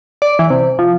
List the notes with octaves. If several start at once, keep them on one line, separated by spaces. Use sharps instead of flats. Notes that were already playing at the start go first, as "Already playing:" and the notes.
D5
E3
C3
F3